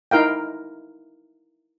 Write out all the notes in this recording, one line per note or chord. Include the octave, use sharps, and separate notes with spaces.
D#4 E4 A#4 F5 G5